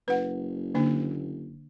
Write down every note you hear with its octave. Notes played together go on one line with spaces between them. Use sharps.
F#1 B4 F#5
D3 A#3 D4